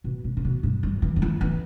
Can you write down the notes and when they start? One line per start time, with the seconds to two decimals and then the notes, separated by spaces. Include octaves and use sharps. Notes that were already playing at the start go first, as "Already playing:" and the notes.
0.04 B2
0.24 D3
0.37 A2
0.44 B2
0.63 G2
0.83 G2
1.02 E3
1.16 D3
1.22 E3
1.41 E3